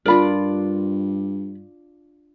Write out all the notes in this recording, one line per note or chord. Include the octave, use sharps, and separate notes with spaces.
G2 D4 F4 A#4 D5 B5